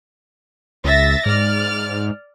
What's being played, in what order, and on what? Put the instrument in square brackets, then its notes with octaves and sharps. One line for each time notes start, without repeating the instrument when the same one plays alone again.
[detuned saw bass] C#2 [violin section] E5 A6 A#6
[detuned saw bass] G#2 [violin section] D5 F6